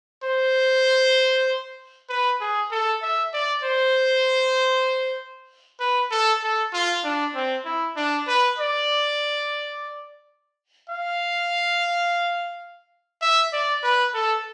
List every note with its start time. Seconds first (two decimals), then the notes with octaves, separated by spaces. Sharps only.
0.24 C5
2.09 B4
2.41 G#4
2.72 A4
3.03 E5
3.33 D5
3.64 C5
5.80 B4
6.11 A4
6.42 A4
6.73 F4
7.04 D4
7.35 C4
7.66 E4
7.96 D4
8.27 B4
8.59 D5
10.90 F5
13.22 E5
13.53 D5
13.83 B4
14.14 A4